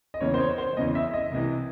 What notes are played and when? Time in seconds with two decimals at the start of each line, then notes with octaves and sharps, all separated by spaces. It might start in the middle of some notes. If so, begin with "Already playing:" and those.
0.14 D#5
0.20 E2 C#3 E3 C#5
0.34 C5
0.40 C#5
0.58 C5
0.77 E2 C#3 E3 D#5
0.95 E5
1.13 D#5
1.32 C2 C3 E3